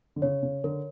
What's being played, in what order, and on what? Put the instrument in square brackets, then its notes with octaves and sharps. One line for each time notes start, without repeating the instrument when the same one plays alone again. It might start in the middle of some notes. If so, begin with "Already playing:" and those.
[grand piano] D3
[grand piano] C#3 [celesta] C#5
[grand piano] C#3
[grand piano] D3 [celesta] A#4